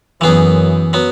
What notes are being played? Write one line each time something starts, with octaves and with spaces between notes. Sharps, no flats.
F#2 E3 B3 G#4
F#3 B3